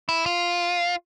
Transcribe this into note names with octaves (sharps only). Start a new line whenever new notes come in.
E4
F4